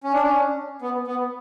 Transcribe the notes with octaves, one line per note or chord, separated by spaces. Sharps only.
C#4
D4
C#4
B3
B3